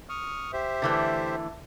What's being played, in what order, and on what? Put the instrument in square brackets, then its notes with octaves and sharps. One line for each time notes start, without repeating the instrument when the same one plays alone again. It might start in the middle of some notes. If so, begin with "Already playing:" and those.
[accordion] C#6 D#6 F6
G4 C5 E5
[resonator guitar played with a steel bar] D3 E3 A3